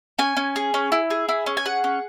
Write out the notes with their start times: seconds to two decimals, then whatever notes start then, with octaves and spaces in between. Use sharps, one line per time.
0.19 C#4 G#5
0.37 C#4
0.56 G#4
0.74 C#4
0.92 E4
1.10 G#4
1.29 E4
1.46 C#4
1.57 G#5
1.65 G#4 F#5
1.84 C#4